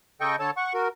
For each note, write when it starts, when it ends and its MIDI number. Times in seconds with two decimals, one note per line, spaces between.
0.21 0.36 49
0.21 0.36 69
0.21 0.36 75
0.21 0.36 79
0.21 0.36 85
0.39 0.51 50
0.39 0.51 69
0.39 0.51 73
0.39 0.51 81
0.57 0.73 78
0.57 0.73 85
0.74 0.88 66
0.74 0.88 70